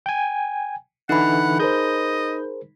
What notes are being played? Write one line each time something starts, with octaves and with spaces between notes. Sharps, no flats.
G5 G#5
D3 E3 D#4 E4 F#5 B5
G#4 A#4 C5 D#5 G6